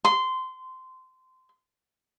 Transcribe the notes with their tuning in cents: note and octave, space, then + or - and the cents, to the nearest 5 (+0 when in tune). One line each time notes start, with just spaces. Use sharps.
C6 -20